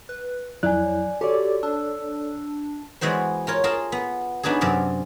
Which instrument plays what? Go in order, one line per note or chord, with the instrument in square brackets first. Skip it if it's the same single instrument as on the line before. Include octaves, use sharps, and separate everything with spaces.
[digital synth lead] B4
[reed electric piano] F2 E4 F#6 [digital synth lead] F#3 [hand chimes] D5 G#5
[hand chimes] F#4 [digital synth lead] G4 [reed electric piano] A4 C#5 D5
[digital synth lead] D4 [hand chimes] E6
[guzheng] E3 G#3 B3 F#4 C5
F4 A#4 C#5
F4 G#4 A#4 A5 C6
B3
B3 D4 D#4 F#4 G#4
F#2 C3 D5 F5